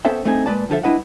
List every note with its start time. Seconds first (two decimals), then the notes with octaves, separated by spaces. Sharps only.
0.05 B3 C#4 A4 C5 E5 G5
0.25 G2 A3 C4 D#4 G4 G#4
0.46 A#2 G#3 B4 D5 A5
0.69 G2 D3 F3 A4 E5
0.83 G3 D4 E4 B4 D#5 F#5